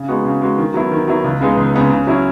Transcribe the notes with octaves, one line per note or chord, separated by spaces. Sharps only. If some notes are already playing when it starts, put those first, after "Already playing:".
Already playing: C#3
G#3 B3 D#4 F#4
C#3
G#3 B3 D#4 F#4
D#3
F#3 B3 E4
D#3
F#3 B3 E4
C#2
C#3 G#3 B3 D#4
C#2
C#3 G#3 B3 D#4
C#3
F#3 C#4 E4